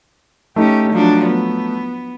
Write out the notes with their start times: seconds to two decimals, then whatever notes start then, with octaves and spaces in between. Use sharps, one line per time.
0.56 A3 C#4 D#4 G4
0.93 F3 F#3 D4
1.27 B3